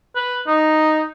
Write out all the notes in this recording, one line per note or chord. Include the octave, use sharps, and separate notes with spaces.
B4
D#4